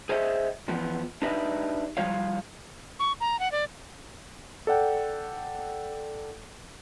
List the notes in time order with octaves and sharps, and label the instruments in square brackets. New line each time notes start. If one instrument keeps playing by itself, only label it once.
[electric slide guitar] G#4 C5 C#5 D#5 E5
E2 F3 B3
D4 D#4 G4 B4 D#5 E5
F3 G3 F4 C#5 F5
[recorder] C#6
A#5
F#5
D5
[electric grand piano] A4 D5 F#5 G5